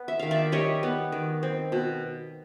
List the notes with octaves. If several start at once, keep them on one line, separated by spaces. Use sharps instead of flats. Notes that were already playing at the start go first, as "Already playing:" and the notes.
Already playing: B3
E5
D#3 F5
D5 E5
G3 C#5 D#5
B3
D#3
C4
B2